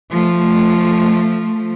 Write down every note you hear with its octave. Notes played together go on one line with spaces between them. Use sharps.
F3 A3